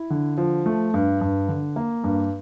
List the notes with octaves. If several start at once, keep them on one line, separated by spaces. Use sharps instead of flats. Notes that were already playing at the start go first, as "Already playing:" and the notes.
Already playing: E4
D3
F3
A3
G2
G2
D3
A#3
G2